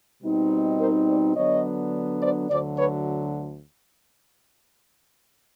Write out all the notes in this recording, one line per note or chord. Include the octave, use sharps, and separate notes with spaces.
B2 G3 C4 D#4
A#4 C5
C5 D5
D3 F#3 B3 D4 C#5 D#5
C5 D5
D2 D3 F#3 C5 D5
B4 C#5